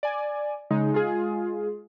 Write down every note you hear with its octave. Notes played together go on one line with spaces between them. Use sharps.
D5 G#5
C#3 G#3 D#4
G#3 F4 G#4